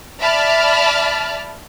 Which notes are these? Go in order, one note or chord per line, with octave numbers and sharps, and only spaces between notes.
D5 E5 A5 B5 F6